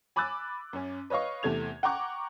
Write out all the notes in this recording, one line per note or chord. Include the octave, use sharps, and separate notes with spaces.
G#5 B5 D6 E6 F#6 A6
F#2 C#4
B4 C#5 D#5 F5 C#6
E2 C3 A3 G#6 F7
F#5 G5 A#5 C#6 D6 F#6